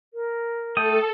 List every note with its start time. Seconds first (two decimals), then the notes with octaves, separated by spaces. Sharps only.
0.14 A#4
0.77 A3 A4 G5 D#6